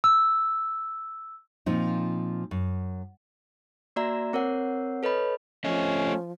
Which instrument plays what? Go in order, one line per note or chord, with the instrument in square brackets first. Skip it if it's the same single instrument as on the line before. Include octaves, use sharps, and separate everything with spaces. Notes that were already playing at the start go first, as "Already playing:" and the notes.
[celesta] E6
[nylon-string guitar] A#2 F3 C4 D#4
F#2
[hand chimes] A#3 F#4 D5 E5 A#5
C4 A#4 C#5 F#5
A4 B4 C#5 D#5 B5
[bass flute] F3 [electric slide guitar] A3 D#5 [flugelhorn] C#4